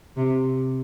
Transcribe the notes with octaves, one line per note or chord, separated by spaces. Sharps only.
C3